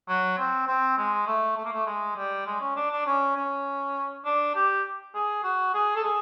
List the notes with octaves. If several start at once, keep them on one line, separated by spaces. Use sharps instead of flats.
F#3
C4
C4
G#3
A3
A3
A#3
A3
G#3
G3
G#3
C#4
D4
D4
C#4
C#4
D4
G4
G#4
F#4
G#4
A4
G#4